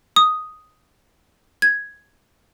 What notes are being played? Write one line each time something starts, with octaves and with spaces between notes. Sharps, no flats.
D#6
G#6